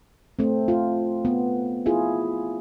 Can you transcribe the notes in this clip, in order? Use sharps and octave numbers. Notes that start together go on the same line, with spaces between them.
A3 C4
F4
B3
E4 F4 G#4